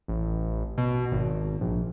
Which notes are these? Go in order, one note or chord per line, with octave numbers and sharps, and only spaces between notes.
A1
B2
G#1
A#1